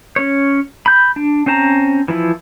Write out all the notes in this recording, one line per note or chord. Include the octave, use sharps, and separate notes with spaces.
C#4 C#5
B5 G6
D4
C4 C#4 C5 A5 A#5
E3 F3 E4